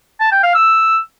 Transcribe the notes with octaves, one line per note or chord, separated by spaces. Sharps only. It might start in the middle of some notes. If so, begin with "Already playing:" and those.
A5
G5
F5
E6